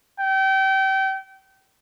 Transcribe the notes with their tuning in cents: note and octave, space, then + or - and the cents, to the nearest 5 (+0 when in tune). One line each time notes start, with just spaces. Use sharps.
G5 -30